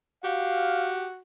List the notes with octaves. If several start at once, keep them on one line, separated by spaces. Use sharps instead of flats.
F#4 G4 F5